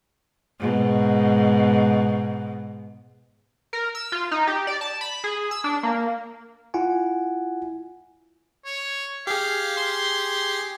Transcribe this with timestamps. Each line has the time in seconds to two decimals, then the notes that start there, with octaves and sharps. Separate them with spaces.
0.59 G#2 B2
3.73 A#4
3.95 E6
4.12 F4
4.31 D#4
4.47 G4
4.67 D5
4.81 A5
5.01 B5
5.24 G#4
5.51 E6
5.64 D4
5.83 A#3
6.74 E4 F4 F#5 G#5
8.66 C#5
9.27 G4 G#4 F5
9.77 C6